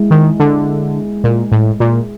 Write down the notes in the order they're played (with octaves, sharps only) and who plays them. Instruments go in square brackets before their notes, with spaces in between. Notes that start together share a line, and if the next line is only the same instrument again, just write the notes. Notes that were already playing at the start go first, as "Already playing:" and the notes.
Already playing: [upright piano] G#3 E4
[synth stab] D#3
D3
A#2
A2
A#2